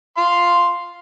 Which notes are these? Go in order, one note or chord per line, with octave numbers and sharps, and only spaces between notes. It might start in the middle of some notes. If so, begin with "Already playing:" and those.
F5 C6